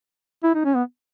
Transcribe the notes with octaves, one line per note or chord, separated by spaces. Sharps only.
E4
D#4
C#4
B3